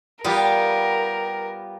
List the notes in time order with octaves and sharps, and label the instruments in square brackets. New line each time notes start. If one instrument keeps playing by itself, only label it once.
[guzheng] G3 [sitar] B3 F4 G4 [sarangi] A#4